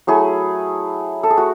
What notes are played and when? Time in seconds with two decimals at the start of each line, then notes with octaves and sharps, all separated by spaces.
0.07 F#3 A3 E4 G#4
1.23 A4
1.30 G#4
1.37 A3 F#4